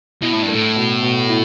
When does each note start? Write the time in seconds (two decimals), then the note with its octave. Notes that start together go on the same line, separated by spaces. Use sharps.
0.22 B2 E4
0.33 A2
0.42 G2
0.48 A3
0.54 A2
0.76 B2
1.02 B2
1.29 E4